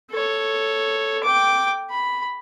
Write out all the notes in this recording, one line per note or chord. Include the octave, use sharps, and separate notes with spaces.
A4 C#5
G5 D6
B5